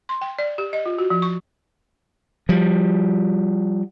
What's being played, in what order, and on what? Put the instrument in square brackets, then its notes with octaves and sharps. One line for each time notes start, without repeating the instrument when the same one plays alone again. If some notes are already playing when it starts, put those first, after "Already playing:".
[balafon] C6
G5
D5
G4
D#5
F4
F#4
F3
C#6
[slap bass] F3 G3